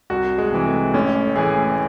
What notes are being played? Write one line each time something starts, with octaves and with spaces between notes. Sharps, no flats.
C2 F#4
G#3
C3 E3
A3
A1 C#4
A2 E3 G#4